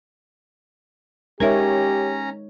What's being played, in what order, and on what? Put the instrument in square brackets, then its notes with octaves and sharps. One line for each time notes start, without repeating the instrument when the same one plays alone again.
[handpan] G#3 D#4 C#5 [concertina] C#4 A#5 [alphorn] G4 [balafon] A#4 E5